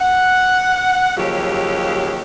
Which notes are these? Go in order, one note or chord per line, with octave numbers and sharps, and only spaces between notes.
F#5
D#2 C#3 F3 F#3 G4 C#5